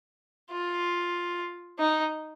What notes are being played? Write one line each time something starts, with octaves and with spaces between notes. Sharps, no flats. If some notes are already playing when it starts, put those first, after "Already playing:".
F4
D#4